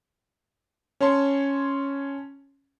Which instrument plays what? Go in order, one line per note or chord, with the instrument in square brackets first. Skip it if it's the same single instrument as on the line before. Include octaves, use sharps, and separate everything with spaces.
[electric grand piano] C#4 C#5 A5 C6